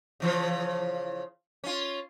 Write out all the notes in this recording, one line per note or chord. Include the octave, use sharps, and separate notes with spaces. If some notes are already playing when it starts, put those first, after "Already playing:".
C#3 E3 F3
C#4 F4